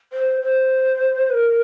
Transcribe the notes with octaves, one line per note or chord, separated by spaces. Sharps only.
C5
C5
B4
A#4